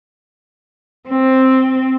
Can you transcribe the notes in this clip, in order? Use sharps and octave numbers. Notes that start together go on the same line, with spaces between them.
C4